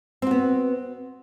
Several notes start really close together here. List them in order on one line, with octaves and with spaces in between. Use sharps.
C4 F#4 B3